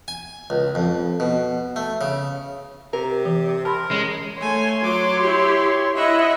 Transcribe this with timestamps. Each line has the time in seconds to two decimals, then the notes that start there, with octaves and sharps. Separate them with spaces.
0.08 G#5
0.50 C#2
0.75 F2
1.20 B2
1.76 A3
2.01 C#3
2.93 C3 A#4
3.25 E3 G4
3.65 G4 A#4 A5 B5 C6
3.91 G#3 C#4
4.40 A3 C#5 G#5 C6
4.81 F#3 D6
5.21 E4 G4
5.96 E4 D#5 E5 F#5